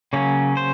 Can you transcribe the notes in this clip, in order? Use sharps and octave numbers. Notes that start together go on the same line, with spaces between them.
C#3 F#3 A#3 C#4
C5